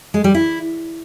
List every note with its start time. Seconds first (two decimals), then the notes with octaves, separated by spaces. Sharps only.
0.14 G#3
0.24 G3
0.34 E4